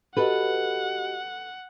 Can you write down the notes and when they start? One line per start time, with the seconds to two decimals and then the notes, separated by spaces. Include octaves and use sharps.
0.17 F#4 G4 A4 B4 D#5 F#5